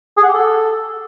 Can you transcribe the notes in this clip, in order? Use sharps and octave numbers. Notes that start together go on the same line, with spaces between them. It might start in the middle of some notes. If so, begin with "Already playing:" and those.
G#4
F#5
G4
A4